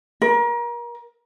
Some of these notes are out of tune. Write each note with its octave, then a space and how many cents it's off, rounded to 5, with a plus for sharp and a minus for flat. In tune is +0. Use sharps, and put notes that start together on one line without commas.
A#4 +30